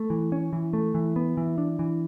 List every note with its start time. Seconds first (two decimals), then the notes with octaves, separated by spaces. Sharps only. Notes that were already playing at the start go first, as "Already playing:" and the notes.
Already playing: A3
0.10 E3
0.32 C#4
0.53 E3
0.73 A3
0.95 E3
1.16 B3
1.37 E3
1.58 D4
1.79 E3